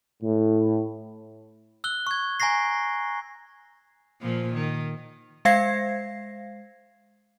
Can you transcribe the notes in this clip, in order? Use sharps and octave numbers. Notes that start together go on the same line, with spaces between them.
A2
E6 F#6 G7
C#6 G#6
G#5 A#5 C#6 A#6 C7
A#2 F3
D#3
G#3 C5 F5 G#6 A#6 C7